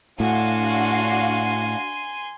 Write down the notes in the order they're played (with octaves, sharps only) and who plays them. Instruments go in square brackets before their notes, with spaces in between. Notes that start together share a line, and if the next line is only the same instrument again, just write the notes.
[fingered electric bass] A2 [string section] D4 F#4 F5 [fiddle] G#5 C6